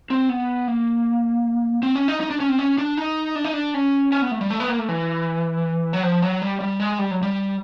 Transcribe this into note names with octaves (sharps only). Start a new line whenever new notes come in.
C4
B3
A#3
C4
C#4
D#4
D#4
D4
C#4
C4
C#4
D4
D#4
D4
D#4
D4
C#4
C#4
B3
A3
G3
A3
B3
A#3
A3
E3
F#3
F3
F#3
G3
G3
G#3
G3
F#3
G3